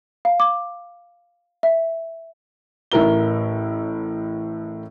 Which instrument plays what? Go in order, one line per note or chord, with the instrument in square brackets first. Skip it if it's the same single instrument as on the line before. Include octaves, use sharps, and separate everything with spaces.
[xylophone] F5
D6
E5
[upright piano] A1 A2 E4 A#4 G7